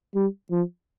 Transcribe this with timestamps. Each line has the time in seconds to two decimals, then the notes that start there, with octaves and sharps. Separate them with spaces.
0.15 G3
0.51 F3